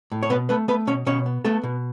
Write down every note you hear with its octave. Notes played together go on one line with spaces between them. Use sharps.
A2
C#5
B2 B3 B4
A3 B3 B4
A3 B3 B4
B2 C#4 C#5
B2 C#4 C#5
B3
A3 B3 A4
B2